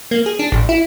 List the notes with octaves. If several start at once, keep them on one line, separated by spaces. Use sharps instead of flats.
A#3
G#4
D4
A1
E4